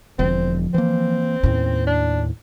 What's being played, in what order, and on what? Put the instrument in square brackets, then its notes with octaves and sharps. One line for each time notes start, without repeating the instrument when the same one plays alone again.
[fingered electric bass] E1 [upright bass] D3 F3 [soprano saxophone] C4
[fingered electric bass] E3 A#3 [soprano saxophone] C4
[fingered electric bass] D#2 A2 [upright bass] C#4
[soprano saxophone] D4